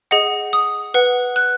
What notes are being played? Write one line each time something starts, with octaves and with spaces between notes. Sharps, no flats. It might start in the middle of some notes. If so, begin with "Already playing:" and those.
G#4 D#5 F#5
D#6
B4 F#5
F#6